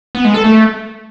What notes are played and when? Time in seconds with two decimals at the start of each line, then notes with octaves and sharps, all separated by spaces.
0.15 B3
0.24 G#3
0.34 A4
0.44 A3